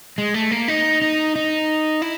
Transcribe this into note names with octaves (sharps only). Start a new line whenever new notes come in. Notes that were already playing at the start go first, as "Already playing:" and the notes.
G#3
A3
A#3
D#4
D#4
D#4
E4